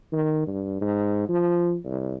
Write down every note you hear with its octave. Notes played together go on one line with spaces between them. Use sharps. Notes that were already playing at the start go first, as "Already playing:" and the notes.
D#3
G2
G#2
F3
C2